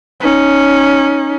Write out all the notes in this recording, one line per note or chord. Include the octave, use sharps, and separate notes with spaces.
C#4 D#4